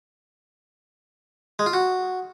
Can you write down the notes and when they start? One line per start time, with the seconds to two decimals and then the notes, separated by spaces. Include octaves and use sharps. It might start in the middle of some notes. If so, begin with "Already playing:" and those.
1.59 G#3
1.66 F4
1.73 F#4